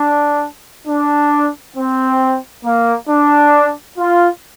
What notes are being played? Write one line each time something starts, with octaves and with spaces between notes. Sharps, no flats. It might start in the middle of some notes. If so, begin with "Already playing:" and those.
Already playing: D4
D4
C4
A#3
D4
F4